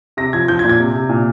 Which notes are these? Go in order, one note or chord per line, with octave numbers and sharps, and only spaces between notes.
C3 A#6
F3 G#6
F3 G6
G#6
A#2
G#6
C3
C3
A#2